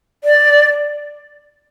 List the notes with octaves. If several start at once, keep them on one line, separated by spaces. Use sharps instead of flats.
D5